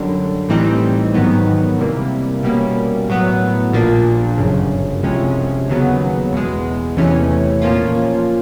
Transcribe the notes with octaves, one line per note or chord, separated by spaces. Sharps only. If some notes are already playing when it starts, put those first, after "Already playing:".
Already playing: F#2 D3 G3
A2 E3 G3 C4 D#4
G#2 D#3 F#3 B3
C3 E3 G3 A#3
B2 G3 A#3 C#4
A2 F#3 B3
A#1 A#2 F3 A#3 D4
G1 F#2 C#3
C2 C3 F3 G#3 C#4
D#2 C#3 F#3 B3
E2 B2 G#3
E2 C3 E3 A3 C#4
A#2 F3 A#3 C#4 F4